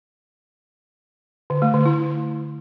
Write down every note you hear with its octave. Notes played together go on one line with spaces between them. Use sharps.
D3
A3
D3
E4